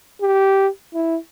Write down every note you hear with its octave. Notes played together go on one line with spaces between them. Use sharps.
G4
E4